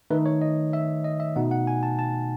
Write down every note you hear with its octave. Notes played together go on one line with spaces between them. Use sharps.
D#3 A3 D#4 B4
C#5
D#5
E5
D#5
E5
B2 A3 D#4 F#5
F#5
G#5
A5
A5